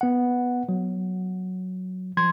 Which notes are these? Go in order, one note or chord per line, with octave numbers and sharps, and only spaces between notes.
B3 F#5
F#3
F3 C6 G#6